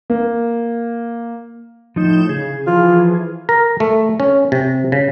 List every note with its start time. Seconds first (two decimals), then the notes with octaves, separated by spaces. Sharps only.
0.10 A#3
1.96 A2 F3 D#4 G6 E7
2.29 C#3 G#4
2.67 E3 F3 F4
3.49 A#4
3.80 A3
4.20 C#4
4.52 C3
4.92 C#3